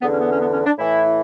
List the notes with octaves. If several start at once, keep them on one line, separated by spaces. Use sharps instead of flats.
E2 D3 B3
C#4
B3
C#4
B3
C#4
D4
A2 E3 E4